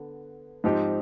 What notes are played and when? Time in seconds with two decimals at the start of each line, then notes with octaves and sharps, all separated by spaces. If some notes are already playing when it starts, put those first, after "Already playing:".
Already playing: D3 B3
0.64 G#2 F3 C4 D#4 G4